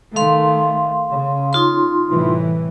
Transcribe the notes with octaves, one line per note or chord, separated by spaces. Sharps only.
D#3 A3 F5 C6
C#3
D#4 F4 C6
C2 A2 E3